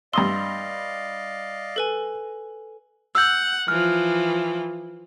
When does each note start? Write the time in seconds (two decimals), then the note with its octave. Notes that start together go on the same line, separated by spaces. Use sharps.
0.13 G2 D5 D#5 F5 C6 D#6 E6
1.76 A4 B4 G#5
3.15 F#5 E6 G6
3.68 E3 F3 F6